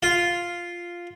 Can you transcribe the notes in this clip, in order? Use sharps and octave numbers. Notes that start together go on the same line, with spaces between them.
F4